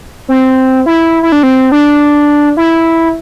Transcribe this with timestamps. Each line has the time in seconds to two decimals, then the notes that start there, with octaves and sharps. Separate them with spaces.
0.28 C4
0.86 E4
1.23 E4
1.32 D4
1.43 C4
1.72 D4
2.57 E4